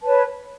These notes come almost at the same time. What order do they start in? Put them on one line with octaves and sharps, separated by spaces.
A5 B4 C#5